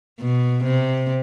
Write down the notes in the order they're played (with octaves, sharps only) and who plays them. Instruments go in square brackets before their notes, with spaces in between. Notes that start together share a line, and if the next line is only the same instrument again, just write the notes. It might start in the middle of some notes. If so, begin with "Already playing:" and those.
[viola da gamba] B2
C3